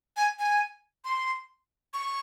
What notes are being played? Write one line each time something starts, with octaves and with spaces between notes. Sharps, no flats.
G#5
G#5
C6
C#6